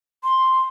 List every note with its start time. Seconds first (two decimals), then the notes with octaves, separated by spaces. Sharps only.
0.24 C6